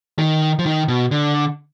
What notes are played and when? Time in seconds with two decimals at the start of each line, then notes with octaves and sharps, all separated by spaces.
0.19 D#3
0.59 F3
0.66 D#3
0.88 B2
1.11 D3